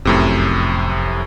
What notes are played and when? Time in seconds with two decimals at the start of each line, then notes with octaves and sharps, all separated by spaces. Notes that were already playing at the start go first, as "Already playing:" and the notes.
0.05 F1 F#2 A2 C3